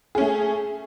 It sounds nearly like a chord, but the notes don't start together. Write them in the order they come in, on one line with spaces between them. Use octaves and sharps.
G#4 C#4 A3